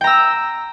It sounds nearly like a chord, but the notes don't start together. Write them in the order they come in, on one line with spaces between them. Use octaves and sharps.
G5 A#5 E6